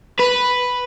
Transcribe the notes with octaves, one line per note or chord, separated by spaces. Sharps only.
B4